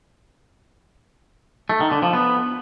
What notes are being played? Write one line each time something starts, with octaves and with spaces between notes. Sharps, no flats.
A3
D#3
D3
F3
B3